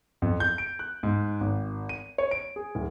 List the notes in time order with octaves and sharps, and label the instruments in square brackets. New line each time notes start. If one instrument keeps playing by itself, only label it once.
[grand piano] F2
G6
D7
F#6
G#2
G#1
D#7
C#5
D7
G#4
D1